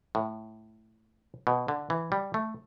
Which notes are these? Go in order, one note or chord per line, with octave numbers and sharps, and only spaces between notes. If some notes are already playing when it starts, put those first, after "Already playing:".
A2
B2
D3
E3
G3
A3